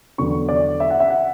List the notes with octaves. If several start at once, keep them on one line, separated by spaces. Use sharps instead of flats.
E2 D3 F#3 C#6
D5
E5
F#5
E5
F#5